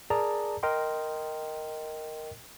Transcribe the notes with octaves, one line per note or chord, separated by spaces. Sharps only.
G#4 A#4 D5 A5 A#5
A#4 D#5 G5 C6